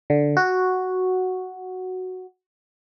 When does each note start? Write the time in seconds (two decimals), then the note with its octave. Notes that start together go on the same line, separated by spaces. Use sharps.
0.10 D3
0.37 F#4